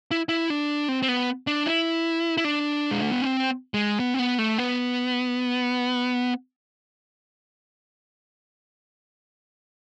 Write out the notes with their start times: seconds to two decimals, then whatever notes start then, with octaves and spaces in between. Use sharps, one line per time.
0.11 E4
0.29 E4
0.50 D4
0.89 C4
1.02 C4
1.08 B3
1.47 D4
1.66 E4
2.37 E4
2.44 D4
2.91 G#3
3.02 A3
3.12 B3
3.22 C4
3.74 G#3
4.00 B3
4.14 C4
4.19 B3
4.38 A3
4.58 B3